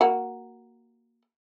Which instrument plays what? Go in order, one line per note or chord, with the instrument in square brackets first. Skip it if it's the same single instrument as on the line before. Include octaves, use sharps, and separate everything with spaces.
[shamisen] A#3 F#4